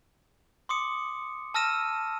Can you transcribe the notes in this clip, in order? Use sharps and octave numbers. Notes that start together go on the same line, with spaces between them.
C6 D6 D#6 C#7
A5 E6 F6 A#6 D#7 E7